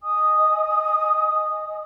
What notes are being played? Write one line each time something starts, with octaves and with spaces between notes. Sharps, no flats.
D#5 G#5 D#6